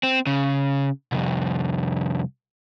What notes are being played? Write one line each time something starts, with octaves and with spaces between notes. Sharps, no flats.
C4
C#3
C2 F2